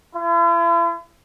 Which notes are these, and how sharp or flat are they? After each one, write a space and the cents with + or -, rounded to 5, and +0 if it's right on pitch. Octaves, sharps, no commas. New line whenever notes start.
E4 +45